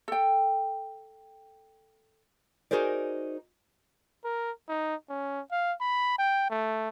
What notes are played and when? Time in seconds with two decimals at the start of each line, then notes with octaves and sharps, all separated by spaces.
0.08 A4 G5
2.71 D#4 F#4 G#4 A#4 C5 D5
4.24 A#4
4.68 D#4
5.09 C#4
5.51 F5
5.81 B5
6.18 G5
6.50 A3